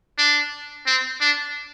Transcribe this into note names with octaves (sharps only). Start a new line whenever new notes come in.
D4
C4
D4